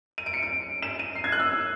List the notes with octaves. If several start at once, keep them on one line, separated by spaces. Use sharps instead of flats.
D#7
D7
C#7
D7
E7
D#7
C7
G#6
F#6
E6